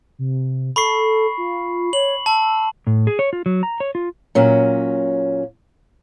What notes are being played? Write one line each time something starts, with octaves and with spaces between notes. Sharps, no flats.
C3
A4 B5 C#6 C7
F4
C#5 F#7
A5 E6
A2
G#4
C#5
F4
F#3
A#5
C#5
F4
A#2 F#3 C#4